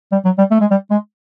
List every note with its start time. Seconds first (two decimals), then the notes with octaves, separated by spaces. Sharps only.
0.12 G3
0.25 F#3
0.38 G3
0.51 A3
0.61 G#3
0.71 G3
0.91 G#3